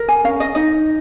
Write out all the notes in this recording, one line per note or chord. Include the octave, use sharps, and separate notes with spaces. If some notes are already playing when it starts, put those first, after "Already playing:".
Already playing: A#4
G#5
C#4 F5
D#5
D#4 D#5